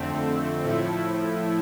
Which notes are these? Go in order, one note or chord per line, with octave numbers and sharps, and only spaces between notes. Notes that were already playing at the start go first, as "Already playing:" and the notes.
Already playing: F2 D3 A3 C4
A2 F3 A3 E4